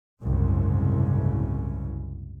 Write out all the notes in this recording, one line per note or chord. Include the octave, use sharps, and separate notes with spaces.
F#1 C2 G#2 C#3